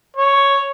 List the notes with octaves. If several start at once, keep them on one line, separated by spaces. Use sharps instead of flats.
C#5